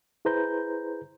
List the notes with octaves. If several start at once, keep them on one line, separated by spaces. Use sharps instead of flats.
E4 G#4 B4 C5 A#5 G6